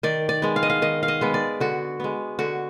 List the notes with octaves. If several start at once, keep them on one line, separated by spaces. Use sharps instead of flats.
D#3 D5
D5
G#3 B3
F5
D#5
F5
D#3 D#5
F5
D#5
G#3 B3
D5
D3 F#4
G#3 B3
D3 F#4